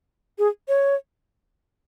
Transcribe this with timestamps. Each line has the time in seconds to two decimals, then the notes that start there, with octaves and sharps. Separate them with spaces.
0.39 G#4
0.68 C#5